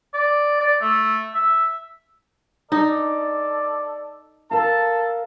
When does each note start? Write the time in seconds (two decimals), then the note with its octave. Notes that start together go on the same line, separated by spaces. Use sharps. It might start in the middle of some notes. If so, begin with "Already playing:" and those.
0.14 D5
0.60 D5
0.81 A3
1.35 E5
2.72 D#4 A4 D5
4.51 A4 A#4 F5 A5